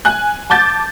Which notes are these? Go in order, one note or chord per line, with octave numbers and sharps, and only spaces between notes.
G#5 F#6
A5 D6 G6 A6